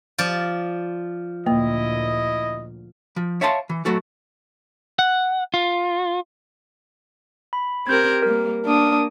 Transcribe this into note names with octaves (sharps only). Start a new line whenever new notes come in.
F3 D5
D2 A#2 A#3 E4 D#5
F3
C#5 E5 F5 A5 B5 C6
E3
F#3 A3 F#4 A4
F#5
F4
B5
C4 G4 A#4 G6 G#6
G3 A#3 A#4
A#3 D4 D#6